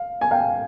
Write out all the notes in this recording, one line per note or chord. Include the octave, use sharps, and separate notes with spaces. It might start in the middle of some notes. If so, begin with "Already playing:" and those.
Already playing: F5
G#5
F5 G5